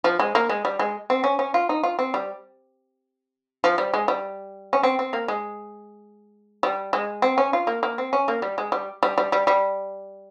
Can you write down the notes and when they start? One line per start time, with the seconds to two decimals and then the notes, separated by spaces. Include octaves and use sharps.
0.04 F3
0.19 G#3
0.35 A#3
0.49 G#3
0.65 G3
0.79 G#3
1.10 C4
1.24 C#4
1.39 C#4
1.54 F4
1.69 D#4
1.83 F4
1.99 C4
2.14 G3
3.64 F3
3.78 G3
3.93 G#3
4.08 G3
4.73 C#4
4.83 C4
4.99 C4
5.13 A#3
5.28 G#3
6.63 G3
6.93 G#3
7.22 C4
7.38 C#4
7.53 F4
7.67 A#3
7.83 A#3
7.98 C4
8.13 C#4
8.28 A#3
8.42 G3
8.58 G#3
8.72 G3
9.03 G3
9.18 G3
9.32 G3
9.47 G3